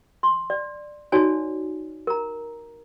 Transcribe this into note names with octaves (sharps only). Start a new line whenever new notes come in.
C6
D5
D#4 F#4 C#5 D5 G#5 A5
A#4 A#5